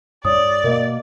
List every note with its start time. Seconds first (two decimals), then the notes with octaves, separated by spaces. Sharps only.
0.25 G2 C#5 D5 D#6
0.64 B2 A#3 A#4 D#5